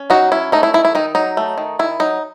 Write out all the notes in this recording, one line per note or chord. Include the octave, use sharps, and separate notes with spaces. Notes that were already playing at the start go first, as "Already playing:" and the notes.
Already playing: C#4
F#3 D#4 F#4
C#4 E4
A3 D#4
E4
D#3 E4
E4
D#3 D#4
F#3 D#4
A3
D#3
D#3 E4
F#3 D#4